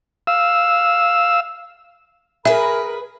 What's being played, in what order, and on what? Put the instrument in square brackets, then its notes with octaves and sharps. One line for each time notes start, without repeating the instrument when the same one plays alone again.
[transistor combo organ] F5 E6
[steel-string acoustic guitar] G#4 B4 [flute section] A#4 B5 [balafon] E5